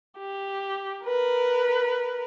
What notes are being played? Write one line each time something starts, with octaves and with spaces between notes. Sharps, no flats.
G4
A#4 B4